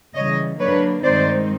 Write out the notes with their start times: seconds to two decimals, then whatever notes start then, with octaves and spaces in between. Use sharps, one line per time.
0.15 C#3 E3 G3 C#5 D#5
0.59 D3 F#3 A#3 D4 B4 C#5
1.04 G2 D#3 G#3 C4 D#4 C5 D5